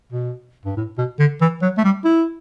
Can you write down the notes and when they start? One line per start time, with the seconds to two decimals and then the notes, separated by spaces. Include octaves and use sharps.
0.12 B2
0.65 G2
0.77 A2
0.98 B2
1.19 D3
1.41 E3
1.62 F#3
1.78 A3
1.84 G3
2.05 E4